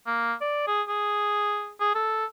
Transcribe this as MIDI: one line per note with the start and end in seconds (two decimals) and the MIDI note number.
0.07 0.33 58
0.41 0.65 74
0.67 0.82 68
0.88 1.72 68
1.80 1.95 68
1.95 2.26 69